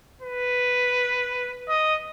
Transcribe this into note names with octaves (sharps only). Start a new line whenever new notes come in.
B4
D#5